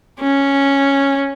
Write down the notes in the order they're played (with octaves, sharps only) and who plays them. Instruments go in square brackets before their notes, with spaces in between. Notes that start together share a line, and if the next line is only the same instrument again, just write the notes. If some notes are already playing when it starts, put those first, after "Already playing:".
[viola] C#4